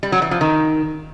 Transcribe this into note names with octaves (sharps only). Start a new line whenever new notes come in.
G3
F#3
E3
F3
D#3